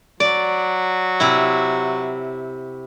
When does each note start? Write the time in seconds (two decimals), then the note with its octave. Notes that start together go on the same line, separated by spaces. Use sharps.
0.20 F#3 D5
1.20 C3 E4